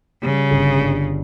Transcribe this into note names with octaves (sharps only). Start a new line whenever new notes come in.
C#3 G3
G1
G2